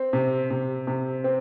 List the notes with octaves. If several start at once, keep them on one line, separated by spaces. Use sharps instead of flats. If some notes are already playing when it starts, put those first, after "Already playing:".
Already playing: C4
C3
C3
C3
C4